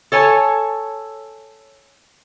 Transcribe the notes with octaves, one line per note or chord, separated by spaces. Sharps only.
A4 C#5 G#5 A5